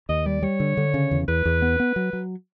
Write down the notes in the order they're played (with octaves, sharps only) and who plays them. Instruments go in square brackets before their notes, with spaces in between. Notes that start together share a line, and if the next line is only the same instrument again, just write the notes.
[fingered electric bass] D#2 [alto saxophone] D#5
[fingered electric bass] G3 [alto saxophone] D5
[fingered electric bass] G3 [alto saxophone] C#5
[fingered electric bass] D3
D3
C#3
E2
[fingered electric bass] E2 [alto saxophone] B4
[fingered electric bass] E2
B3
B3
F#3
F#3